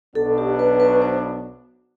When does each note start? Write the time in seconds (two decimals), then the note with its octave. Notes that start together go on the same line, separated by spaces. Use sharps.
0.15 B1 B2 F#3 B3 D4 A4
0.38 G4
0.59 B4
0.80 B4
1.02 C5